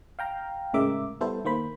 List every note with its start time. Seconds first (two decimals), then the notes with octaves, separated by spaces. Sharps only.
0.19 F5 G5 A#5
0.74 A2 C#3 G#3 A#4 E5 D6
1.21 G3 B3 E4 A4 C5
1.45 D#3 A#3 C5 B5